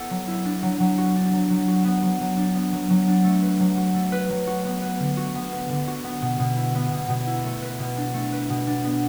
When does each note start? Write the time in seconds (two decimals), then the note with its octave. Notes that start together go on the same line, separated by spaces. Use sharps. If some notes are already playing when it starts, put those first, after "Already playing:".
Already playing: B3 E4 A4
0.10 F#3
0.28 E4
0.45 D4
0.63 F#3
0.80 F#3
0.98 F#4
1.16 D4
1.33 F#3
1.50 F#3
1.68 F#4
1.84 B3
2.03 F#3
2.21 F#3
2.37 D4
2.55 B3
2.72 F#3
2.90 F#3
3.07 D4
3.24 A3
3.42 B4
3.60 F#3
3.77 F#4
3.94 A3
4.12 B4
4.29 F#3
4.47 F#4
4.65 B3
4.82 B4
4.99 D3
5.17 F#4
5.35 B3
5.52 B4
5.69 D3
5.87 F#4
6.04 B3
6.22 B2
6.39 B2
6.57 E4
6.75 B3
6.92 B2
7.09 B2
7.27 E4
7.44 A3
7.62 B4
7.79 B2
7.97 D4
8.14 A3
8.32 B4
8.50 B2
8.67 D4
8.84 B3